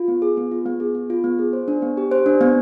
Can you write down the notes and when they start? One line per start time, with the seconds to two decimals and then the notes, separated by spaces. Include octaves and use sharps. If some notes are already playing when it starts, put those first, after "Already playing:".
Already playing: F4
0.08 B3
0.22 G#4
0.37 B3
0.51 F4
0.66 B3
0.80 G#4
0.95 B3
1.10 F4
1.24 B3
1.39 G#4
1.53 C5
1.68 D4
1.82 B3
1.97 G4
2.11 C5
2.26 D4
2.41 B3